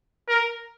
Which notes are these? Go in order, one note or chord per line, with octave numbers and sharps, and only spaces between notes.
A#4